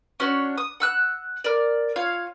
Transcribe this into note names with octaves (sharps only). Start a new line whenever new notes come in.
C#4 D4 F#4 C#5
D#6
F#5 E6 F#6
A#4 D5
F4 C#5 F5